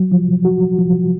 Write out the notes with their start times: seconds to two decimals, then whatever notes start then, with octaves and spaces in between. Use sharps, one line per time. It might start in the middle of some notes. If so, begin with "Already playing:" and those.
Already playing: F#3
0.12 F3
0.45 F#4
0.78 F3